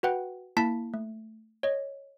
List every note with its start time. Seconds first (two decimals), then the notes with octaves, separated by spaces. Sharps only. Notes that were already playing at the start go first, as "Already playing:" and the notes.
0.03 F#4 B4 F#5 G5
0.57 A#3 E4 A5 B6
0.94 A3
1.63 C#5 D#5